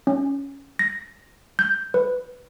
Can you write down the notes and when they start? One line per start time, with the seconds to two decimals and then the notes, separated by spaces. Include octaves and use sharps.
0.07 C#4
0.79 A#6
1.59 G6
1.94 B4